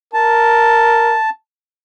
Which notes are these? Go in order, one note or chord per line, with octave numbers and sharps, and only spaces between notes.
A#4 A5